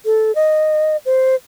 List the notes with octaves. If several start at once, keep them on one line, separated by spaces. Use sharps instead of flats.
A4
D#5
C5